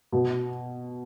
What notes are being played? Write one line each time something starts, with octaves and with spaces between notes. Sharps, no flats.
B2